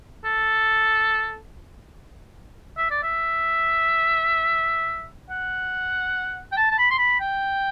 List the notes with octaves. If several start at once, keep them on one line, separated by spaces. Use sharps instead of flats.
A4
E5
D5
E5
F#5
G5
A5
A5
B5
C6
B5
G5